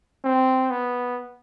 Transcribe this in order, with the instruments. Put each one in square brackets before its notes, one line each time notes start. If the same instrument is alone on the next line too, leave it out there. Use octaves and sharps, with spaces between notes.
[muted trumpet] C4
B3